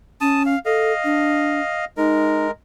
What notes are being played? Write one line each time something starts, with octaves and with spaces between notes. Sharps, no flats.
C#4 A5 D#6
F5
A4 D#5 F5
D4
G#3 D#4 A#4